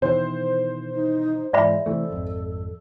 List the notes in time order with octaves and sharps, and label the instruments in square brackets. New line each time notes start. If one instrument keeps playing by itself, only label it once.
[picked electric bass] B2 D#3 E3 [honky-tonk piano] C5
[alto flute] D#4
[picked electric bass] G#2 E3 [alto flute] G#3 [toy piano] D5 E5 B5
[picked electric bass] C3 E3 A3 [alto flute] A4
[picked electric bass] G#1 F2